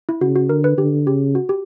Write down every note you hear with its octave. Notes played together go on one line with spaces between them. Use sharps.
E4
C#3 F#4
F#4
D3 A#4
B4
D3 G4
C#3 G4
F#4
G4